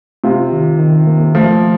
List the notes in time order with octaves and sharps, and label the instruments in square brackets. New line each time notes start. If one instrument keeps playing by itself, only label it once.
[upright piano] C3 [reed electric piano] F4
[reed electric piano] D#3
D#3
A#3
[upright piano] F3 [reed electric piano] A3